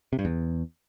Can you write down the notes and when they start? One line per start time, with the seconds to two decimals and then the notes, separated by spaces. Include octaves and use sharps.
0.13 C3
0.19 G2
0.25 E2